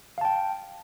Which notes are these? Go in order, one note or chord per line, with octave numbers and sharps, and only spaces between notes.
F5 G5 A5